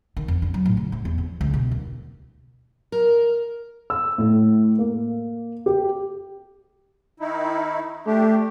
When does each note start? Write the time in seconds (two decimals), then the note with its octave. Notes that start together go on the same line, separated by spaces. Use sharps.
0.17 D#3
0.28 F2
0.42 D4
0.54 F#3
0.65 A2
0.77 C#3
0.92 G2
1.05 E2
1.18 F2
1.41 C#2
1.54 B2
1.71 D#2
2.92 A#4
3.90 E6
4.18 A2
4.79 A#3
5.66 G4
7.20 D#3 D#4 E4
8.06 A3 D4 G4